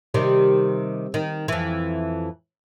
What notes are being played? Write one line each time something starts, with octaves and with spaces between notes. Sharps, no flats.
C3 D#3 G3
D#3
F2 E3